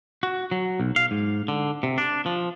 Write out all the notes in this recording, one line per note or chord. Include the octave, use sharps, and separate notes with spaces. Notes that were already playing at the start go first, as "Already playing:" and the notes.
F#4
F#3
B1
F5
G#2
D3
C3
D4
F3